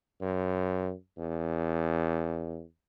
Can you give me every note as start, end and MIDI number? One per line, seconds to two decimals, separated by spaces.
0.21 0.91 42
1.18 2.61 40